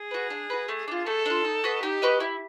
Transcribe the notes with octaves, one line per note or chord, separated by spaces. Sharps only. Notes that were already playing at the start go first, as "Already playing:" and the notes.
Already playing: G#4
F#4 B4
D4
F#4 B4
A3
D4 F4
A3 A4
D4 F4
D#4
F#4 B4 D#5
D#4 G4
F#4 B4 D#5
E4